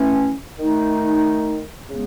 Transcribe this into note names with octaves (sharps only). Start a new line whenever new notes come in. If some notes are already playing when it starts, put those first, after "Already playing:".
Already playing: E3 A3 C#4
D#3 A3 D#4
C#3 G#3 B3